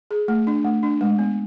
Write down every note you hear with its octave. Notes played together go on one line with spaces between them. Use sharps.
G#4
A3
D4
A3
D4
G#3
B3